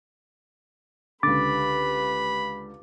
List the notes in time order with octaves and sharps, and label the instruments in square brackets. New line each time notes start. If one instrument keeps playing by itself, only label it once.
[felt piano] C#2 D3 [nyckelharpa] G4 B4 [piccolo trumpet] B5 [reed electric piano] D6 A6